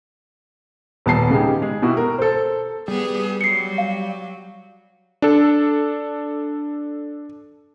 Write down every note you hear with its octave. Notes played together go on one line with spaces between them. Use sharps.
D#1 B3 A5 C7
C#3 G#3 B3 D#4 G4
G#3 G#4
B2 E4 F#4 G4
A#4
A4 C5
G3 B3 G#4
F#3 C7 C#7
F5
D4 A4